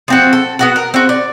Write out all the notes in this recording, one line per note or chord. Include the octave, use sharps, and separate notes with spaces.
F3 C4 F#4
A4
B3 F#4 F#5
A#4
C4 F#4
D5